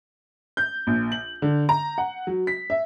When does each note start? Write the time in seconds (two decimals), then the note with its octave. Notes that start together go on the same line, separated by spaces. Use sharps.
0.57 G6
0.87 A#1
1.12 F#7
1.42 D3
1.69 A#5
1.98 F#5
2.27 F#3
2.47 B6
2.70 E5